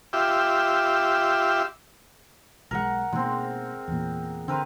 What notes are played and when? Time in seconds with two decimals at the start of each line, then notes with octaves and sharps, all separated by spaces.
0.13 F4 G4 E5
2.71 B1 F3 G#3 A#4 F#5
3.12 B2 D#3 G#3 A#3 C4
3.88 E2 A#2
4.48 D3 C4 A#4 B4